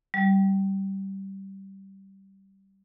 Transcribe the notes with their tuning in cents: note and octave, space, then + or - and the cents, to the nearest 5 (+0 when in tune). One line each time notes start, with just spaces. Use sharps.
G3 -15